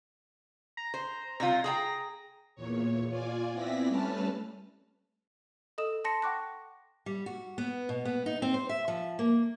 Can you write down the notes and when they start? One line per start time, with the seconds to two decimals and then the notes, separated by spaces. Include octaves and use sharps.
0.77 A#5
0.94 C5
1.40 C3 G3 F4 A#6
1.64 G#4 G5 A#5
2.55 E2 A#2 C#5
3.09 F4 D5 G#5
3.52 B3 C4 E4 D5 A#6 B6
3.88 G3 A3 C#4 B4 A5 F6
5.78 A4 D#5 D#6 E7
6.05 A5 C6 A#6 C#7
6.22 F#5 G5 C#6 D6 F#6 A#6
7.06 G3
7.26 F#4
7.58 B3
7.89 B2
8.05 B3
8.26 D#4
8.42 C4
8.54 C5
8.69 E5
8.88 F3
9.19 A#3